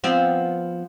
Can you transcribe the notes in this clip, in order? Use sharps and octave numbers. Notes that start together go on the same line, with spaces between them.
F3 B3 C4